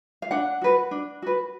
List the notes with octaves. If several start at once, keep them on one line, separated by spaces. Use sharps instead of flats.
F5
D4 F#5
F#4 B4
D4
F#4 B4